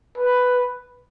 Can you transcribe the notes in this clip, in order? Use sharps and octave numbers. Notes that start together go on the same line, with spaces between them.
B4